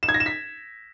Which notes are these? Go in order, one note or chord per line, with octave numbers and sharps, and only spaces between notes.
E7
G#6
A#6
E7
B6